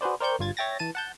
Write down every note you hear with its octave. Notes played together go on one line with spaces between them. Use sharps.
F#4 G#4 B4 C5 D5
A#4 C5 D5 G5 C#6 G6
G1 G2 F4 G#6 A6
C#5 E5 G5 A6 A#6
E3 A5 D#7
F#5 A5 G6